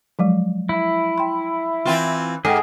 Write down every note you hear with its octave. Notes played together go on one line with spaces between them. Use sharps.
F3 F#3 G#3
E4
G5 C6
E3 C4 F4
G#2 G#4 A4 G5